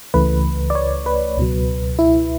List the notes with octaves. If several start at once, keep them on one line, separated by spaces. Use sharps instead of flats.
C#2 C#3 E3 A3 B4
D5
C#5
B4
C#2 B2 F#3
E4